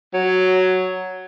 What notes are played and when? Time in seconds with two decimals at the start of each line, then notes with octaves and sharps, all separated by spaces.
0.14 F#3